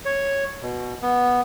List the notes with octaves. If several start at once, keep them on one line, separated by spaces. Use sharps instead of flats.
C#5
B2
B3